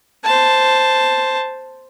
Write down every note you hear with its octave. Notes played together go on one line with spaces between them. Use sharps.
C5 A5